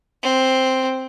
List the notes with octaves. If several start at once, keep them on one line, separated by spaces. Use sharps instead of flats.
C4